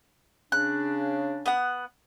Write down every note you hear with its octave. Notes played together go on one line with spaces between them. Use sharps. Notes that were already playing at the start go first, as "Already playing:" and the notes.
C#3 D4 F#6
B3 F#5